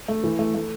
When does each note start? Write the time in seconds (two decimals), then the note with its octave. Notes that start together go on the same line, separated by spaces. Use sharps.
0.08 A3
0.24 E3
0.39 A3
0.55 A3